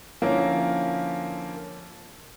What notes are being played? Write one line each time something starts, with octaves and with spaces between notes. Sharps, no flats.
D3 F3 A#3 C#4 E4 A#4